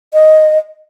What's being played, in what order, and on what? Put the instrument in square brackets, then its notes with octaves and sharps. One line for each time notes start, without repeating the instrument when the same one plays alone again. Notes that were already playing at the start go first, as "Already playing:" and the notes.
[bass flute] D#5